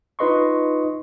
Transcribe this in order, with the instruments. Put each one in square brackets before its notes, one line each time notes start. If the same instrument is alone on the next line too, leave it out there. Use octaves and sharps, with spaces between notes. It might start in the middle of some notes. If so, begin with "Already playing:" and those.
[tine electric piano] D#4 F4 B4 D#5 C6 C#6